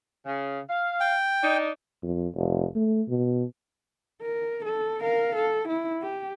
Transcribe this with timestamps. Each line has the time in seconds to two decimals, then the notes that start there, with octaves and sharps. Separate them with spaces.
0.25 C#3
0.68 F5
1.00 G5
1.42 D4 D#4
2.03 F2
2.35 F1
2.75 A3
3.08 B2
4.22 A#4
4.65 A4
5.02 A#4 F5
5.36 A4
5.68 E4
6.02 G4